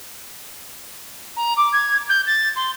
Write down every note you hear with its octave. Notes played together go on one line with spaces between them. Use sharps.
A#5
D6
G#6
G6
A6
C6